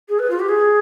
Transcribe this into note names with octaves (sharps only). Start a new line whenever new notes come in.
G#4
B4
F4
G4
G#4